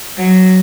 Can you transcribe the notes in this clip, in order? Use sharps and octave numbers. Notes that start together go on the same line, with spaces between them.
F#3